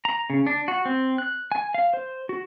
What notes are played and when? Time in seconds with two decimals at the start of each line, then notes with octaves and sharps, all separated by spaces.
0.05 A#5
0.30 C#3
0.47 D4
0.68 F#4
0.85 C4
1.18 F#6
1.52 G#5
1.74 F5
1.93 C5
2.29 F#4